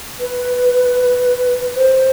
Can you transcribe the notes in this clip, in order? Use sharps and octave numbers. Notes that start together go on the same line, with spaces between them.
B4
C5